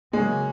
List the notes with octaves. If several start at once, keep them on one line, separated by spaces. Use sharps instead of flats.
C#3 F#3 G#3 A#3 C#4